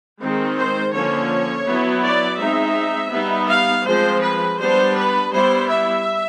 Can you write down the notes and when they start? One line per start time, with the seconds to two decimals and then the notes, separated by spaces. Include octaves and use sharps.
0.21 D#3 G#3 C4 D#4
0.57 C5
0.93 D3 F3 A#3 C#4 C#5
1.66 F#3 B3 E4
2.03 D5
2.39 G#3 C4 D#4 E5
3.12 G3 B3 D#4
3.49 F5
3.85 F3 G#3 C4 C5
4.22 B4
4.58 G3 B3 D4 C5
4.95 B4
5.31 G3 B3 E4 C5
5.68 E5